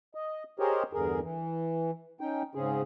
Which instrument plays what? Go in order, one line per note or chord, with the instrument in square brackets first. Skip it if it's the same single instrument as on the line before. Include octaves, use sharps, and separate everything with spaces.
[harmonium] D#5
G4 G#4 A#4 C5 C#5 D#5
E2 G2 D3 G#4 A#4
E3
C#4 D#4 G5
G#2 C#3 C4 C#4 G#4